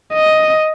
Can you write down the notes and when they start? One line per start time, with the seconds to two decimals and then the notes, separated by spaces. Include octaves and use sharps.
0.14 D#5